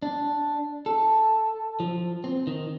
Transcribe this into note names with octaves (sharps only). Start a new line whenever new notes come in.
D4
A4
F3
C4
D#3